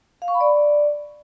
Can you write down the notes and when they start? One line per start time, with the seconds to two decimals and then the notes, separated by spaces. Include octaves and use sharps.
0.22 F5
0.28 C#6
0.34 B5
0.41 D5